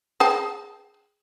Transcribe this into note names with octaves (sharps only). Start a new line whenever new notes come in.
G#4 G5 A5